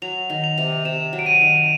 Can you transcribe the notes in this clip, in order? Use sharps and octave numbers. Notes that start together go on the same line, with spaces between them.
F#3 F7
D#3
F7
C3
C3 E7
F#3
D7
D#7
D#3